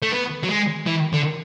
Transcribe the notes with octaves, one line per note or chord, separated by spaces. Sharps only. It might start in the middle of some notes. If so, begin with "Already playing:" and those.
A3
B3
F#3
G#3
E3
D3